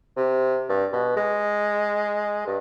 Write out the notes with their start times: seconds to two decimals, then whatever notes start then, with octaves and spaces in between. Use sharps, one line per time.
0.17 C3
0.69 G2
0.93 B2
1.16 G#3
2.47 G2